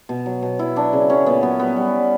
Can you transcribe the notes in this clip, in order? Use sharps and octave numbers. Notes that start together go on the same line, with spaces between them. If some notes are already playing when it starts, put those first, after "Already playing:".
B2
F#3
B2
F#3 E4
F#3 D4
C#3
F#3 C#4
A#2 B3
F#3 B3
G3 B3
G3
G3